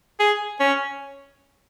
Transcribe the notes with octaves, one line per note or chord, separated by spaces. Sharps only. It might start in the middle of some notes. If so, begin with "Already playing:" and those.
G#4
C#4